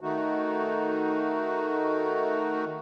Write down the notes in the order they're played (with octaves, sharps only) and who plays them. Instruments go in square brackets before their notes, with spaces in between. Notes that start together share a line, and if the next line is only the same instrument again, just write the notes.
[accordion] D#3 A3 D#4 F#4